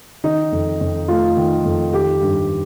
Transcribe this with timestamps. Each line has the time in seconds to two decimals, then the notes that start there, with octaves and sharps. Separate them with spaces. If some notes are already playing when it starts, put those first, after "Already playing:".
0.24 D#3 D#4
0.52 F2
0.81 F2
1.08 A3 F4
1.37 D#3
1.65 F2
1.93 D#3 G4
2.21 G2